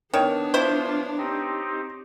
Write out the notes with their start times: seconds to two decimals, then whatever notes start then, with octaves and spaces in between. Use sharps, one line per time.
0.14 D#3 B3 D4 C#5
0.54 E4 F4 C5
1.18 C4 D#4 G4